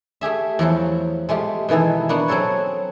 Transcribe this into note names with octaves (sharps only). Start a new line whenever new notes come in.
A3 G4 G#4 E5
E2 F3 F#3 F4
G#3 A3 F4 G4
B2 D#3 E3 G#4 A4
A#3 B3 D4 F#4
F#3 C4 G#4 A4 C#5